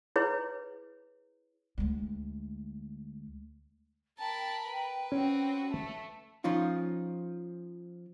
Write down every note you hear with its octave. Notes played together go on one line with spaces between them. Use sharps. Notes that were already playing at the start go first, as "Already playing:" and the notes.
E4 G#4 B4 C#5
D2 G#3
A#4 G5 A5 B5
B4
C4 C#4 F#4
A3
F3 C#4 D#4 F4